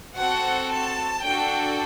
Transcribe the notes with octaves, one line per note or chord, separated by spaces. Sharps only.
C4 F#4 A4 F#5
A5
D4 F#4 A4 G5